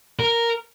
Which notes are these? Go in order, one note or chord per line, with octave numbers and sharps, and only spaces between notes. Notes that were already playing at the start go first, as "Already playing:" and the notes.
A#4